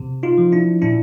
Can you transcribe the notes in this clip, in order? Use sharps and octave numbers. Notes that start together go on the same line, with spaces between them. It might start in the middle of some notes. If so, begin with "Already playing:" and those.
Already playing: C3
D#4 F4
F3
D4 E4
A#2 D4 E4